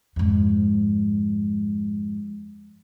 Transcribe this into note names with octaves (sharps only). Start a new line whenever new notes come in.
F2 G#2